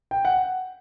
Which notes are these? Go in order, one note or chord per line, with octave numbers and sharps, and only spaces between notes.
G5
F#5